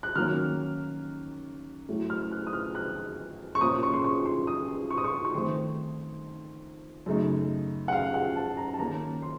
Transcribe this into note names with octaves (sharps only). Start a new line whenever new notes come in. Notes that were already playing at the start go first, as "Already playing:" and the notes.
F#6
D#3 F#3 A#3 C#4 F6
A2 F#3 A3
F6
F#6
D#6
F6
F#6
C#6
A#2 F3 A#3 C#4 D#6
C#6
C6
C#6
C6
D#6
C#6
D#6
C#6
C#6
F2 D#3 A3 C4 C6
F#2 C#3 A3 D#4
F#5
F5
F#5
A5
A#5
A5
D#3 A#3 C#4 A#5
C6